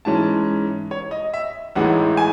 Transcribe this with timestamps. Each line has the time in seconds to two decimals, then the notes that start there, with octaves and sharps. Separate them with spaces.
0.05 G#2 E3 G#3 C#4 A5
0.91 C#5
1.11 D#5
1.34 E5
1.76 A1 A2 E3 G#3 D#4 F#5
2.17 G#5